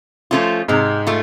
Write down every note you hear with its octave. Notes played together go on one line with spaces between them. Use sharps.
F3 A3 C#4 F4
G#2 C3 G#3
A3 F4